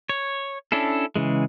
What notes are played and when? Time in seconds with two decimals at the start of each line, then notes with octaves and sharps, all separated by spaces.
0.09 C#5
0.72 C#4 D4 E4 A4
1.16 C#3 E3 G#3